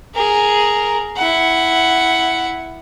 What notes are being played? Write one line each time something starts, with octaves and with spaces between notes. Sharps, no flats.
G#4 A#4
E4 F#5